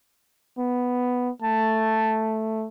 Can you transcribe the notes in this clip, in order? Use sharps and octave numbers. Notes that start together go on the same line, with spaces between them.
B3
A3 A5